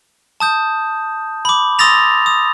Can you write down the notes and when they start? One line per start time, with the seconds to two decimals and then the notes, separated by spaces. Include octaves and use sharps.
0.40 A5 D#6 G6
1.45 B5 D6
1.79 C6 D#6 E6 A6 A#6 F7
2.26 D#6